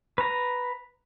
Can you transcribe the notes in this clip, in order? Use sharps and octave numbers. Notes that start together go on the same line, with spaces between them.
B4 A#5